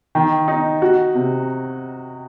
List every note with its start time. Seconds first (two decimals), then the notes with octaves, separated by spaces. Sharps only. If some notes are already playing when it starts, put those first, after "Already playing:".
0.15 D#3
0.48 D#4
0.82 F#4
1.15 C3